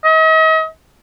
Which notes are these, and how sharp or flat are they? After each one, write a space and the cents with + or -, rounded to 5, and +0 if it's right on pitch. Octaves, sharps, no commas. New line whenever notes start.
D#5 +40